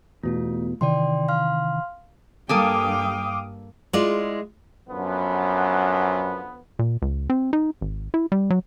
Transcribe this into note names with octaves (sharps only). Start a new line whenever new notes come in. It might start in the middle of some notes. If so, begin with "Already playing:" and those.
E2 B2 A3 F4
C3 D#3 E3 D5 G5 C6
F5 C6 F6
G2 A#3 A4 F5 G5 G#5 D6 D#6
G#3 E4 F4 D5
F#2 D3 F3 B3
A#2
C#2
C4
D#4
G#1
E4
G3
F#3